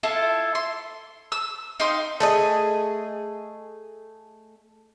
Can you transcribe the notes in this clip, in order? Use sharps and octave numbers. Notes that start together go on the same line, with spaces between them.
E4 F4 A4
C6
E6
D#4 F5 G5 C6
A3 G#4 D#5